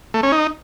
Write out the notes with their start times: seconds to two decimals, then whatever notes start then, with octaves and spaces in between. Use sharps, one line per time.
0.14 A3
0.23 C#4
0.32 D#4